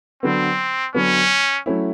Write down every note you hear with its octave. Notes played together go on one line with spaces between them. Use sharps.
D3 F#3 B3 C4
D3 F#3 B3 C#4
F#3 A3 C#4 E4